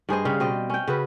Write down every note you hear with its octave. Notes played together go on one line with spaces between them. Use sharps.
G2 G#4 C5 D#5
C#3 G3 F5
B2 C4 D#5 G5
C#4 G5
C#3 F#4 B4